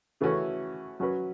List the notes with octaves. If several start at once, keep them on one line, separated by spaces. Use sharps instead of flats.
C#3 E3 A3 C#4 F#4
F#3 C#4 F#4 B4